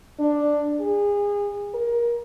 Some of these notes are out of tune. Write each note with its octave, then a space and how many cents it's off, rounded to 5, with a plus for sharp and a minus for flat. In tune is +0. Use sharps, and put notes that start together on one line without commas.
D4 +5
G#4 -30
A#4 +20